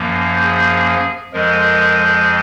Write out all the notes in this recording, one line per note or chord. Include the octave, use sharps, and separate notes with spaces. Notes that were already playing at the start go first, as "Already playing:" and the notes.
Already playing: F#2 F3 A#3
G#4
F2 F3 G#3 A#4